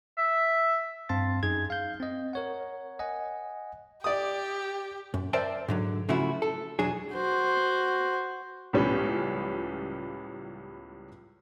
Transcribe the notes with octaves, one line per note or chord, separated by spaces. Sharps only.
E5
G2 C4 F5 A5 C6 A6
F#2 D#4 G#4 G#6
F5 G6
C4 D#5
A#4 C#5 F#5
D#5 F#5 G#5
G4 D5 D#6
F#2
A#4 C5 D5 E5 G5 A5
G#2 D3 F#3
C#3 F3 A3 E4 F#4
A4
B1 E2 F#3 D4 G#4
F#4 C5
C#2 A2 F3 G3 B3 C#4